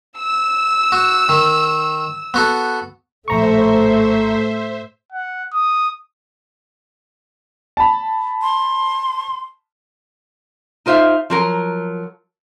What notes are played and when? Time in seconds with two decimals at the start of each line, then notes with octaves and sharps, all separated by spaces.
0.17 E6
0.92 F#4
1.29 D#3
2.34 B3 F#4 A4
3.28 A#1 A2 A3 C5 E5 A#5 C#6
5.12 F#5
5.53 D#6
7.77 A5 B5
8.42 C6
10.86 D#4 F4 C5 E5 F5
11.30 F3 F#3 A#4